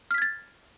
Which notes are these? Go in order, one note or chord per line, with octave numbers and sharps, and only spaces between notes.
F6 G#6 A6 B6